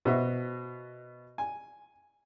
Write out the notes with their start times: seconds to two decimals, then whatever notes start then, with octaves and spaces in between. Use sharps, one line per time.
0.05 B2 F#4 C5 E5
1.38 G#5